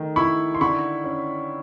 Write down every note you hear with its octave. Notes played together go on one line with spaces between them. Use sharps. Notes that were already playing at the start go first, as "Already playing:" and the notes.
Already playing: D#3 A3
E4 B5 C#6
C6
D3 B5 C#6
C#4